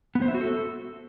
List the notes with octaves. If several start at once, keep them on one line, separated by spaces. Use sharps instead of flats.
B3
C5
E5
F#4
A4